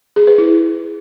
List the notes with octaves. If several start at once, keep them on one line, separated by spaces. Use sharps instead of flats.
G#4
B4
E4